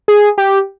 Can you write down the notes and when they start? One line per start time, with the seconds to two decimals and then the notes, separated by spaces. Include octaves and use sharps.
0.08 G#4
0.38 G4